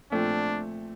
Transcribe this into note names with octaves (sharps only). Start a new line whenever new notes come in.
A#2 F3 A3 C4 D4